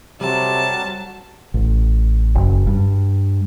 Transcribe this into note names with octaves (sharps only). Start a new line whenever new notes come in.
C3 F#3 G3 A4 A5
A1
F#1
G2